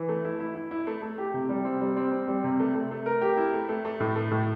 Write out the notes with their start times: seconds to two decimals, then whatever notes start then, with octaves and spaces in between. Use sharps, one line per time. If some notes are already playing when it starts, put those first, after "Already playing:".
Already playing: E3
0.08 A3
0.24 E4
0.40 E4
0.55 E4
0.71 E4
0.87 A3
1.02 A3
1.18 G4
1.34 C3
1.49 G3
1.65 C4
1.81 G3
1.96 C4
2.12 C4
2.28 G3
2.44 C3
2.59 A3
2.75 A3
2.91 A3
3.06 A#4
3.21 G4
3.37 E4
3.53 A3
3.69 A3
3.85 A3
4.00 A2
4.16 A3
4.31 A2